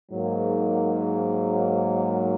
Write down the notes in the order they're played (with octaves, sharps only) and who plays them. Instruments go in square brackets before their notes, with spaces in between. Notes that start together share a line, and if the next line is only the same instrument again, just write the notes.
[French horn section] G#2 F#3 A#3